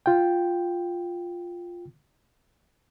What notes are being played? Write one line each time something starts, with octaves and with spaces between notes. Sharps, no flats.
F4 G5